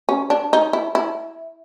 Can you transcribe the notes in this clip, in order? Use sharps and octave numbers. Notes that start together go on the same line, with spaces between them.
C#4
D4
D#4
E4
E4